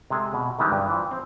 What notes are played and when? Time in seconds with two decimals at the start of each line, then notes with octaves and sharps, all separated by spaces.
0.10 C3 G#3 G#4 A4
0.34 B2
0.59 C3 D#3 E3 G3 G#3 C#4
0.72 G2
0.88 E3 F3
1.11 C4